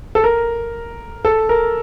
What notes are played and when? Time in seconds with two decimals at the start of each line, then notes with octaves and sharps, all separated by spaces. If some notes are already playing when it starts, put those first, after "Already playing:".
0.15 A4
0.24 A#4
1.25 A4
1.49 A#4